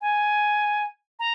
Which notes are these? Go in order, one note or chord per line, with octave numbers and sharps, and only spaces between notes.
G#5
A#5